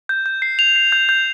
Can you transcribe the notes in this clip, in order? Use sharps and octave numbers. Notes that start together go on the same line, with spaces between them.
G6
G6
C7
F7
C7
G6
G6